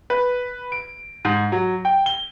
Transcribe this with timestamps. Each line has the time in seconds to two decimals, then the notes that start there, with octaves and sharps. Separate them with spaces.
0.10 B4
0.72 D7
1.25 G#2
1.52 F#3
1.85 G5
2.06 G7